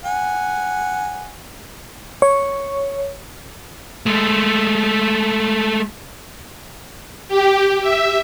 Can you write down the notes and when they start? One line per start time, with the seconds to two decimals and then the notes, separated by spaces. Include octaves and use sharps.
0.05 F#5 G#5
2.22 C#5
4.06 G#3 A3
7.28 G4
7.82 E5